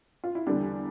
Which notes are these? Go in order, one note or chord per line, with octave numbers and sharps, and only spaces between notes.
F4
E4
E2 D3 G3 D4